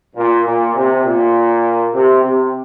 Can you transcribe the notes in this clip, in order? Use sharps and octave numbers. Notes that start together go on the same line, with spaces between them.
A#2
A#2
C3
A#2
C3
C3